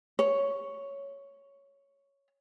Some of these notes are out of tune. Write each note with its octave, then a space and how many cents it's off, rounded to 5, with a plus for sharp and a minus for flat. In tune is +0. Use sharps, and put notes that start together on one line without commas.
C#5 +5